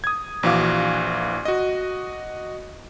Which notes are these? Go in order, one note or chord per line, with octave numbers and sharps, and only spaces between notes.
D#6 G#6
A#1 E3 F#4 F5 D6
F#4 D#5